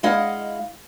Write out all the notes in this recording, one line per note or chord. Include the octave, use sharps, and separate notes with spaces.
G#3 E4 D#5 F5 F#5